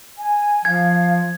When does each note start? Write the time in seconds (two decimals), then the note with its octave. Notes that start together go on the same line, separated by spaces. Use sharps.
0.18 G#5
0.65 F3 F5 G#6